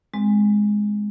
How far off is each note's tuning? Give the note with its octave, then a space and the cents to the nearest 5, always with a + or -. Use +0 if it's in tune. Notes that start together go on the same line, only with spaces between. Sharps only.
G#3 +0 C4 +0